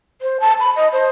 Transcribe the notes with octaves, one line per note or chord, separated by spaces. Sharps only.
C5
A5
B5
D#5
C5